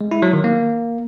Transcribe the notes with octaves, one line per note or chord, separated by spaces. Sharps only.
G#3
E4
F#3
D#3
A#3